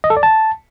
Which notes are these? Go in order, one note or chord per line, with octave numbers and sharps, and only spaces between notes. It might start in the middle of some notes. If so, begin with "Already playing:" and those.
D#5
A4
D5
A5